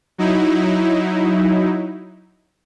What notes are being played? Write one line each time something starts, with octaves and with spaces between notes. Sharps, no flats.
F#3 D#4 E4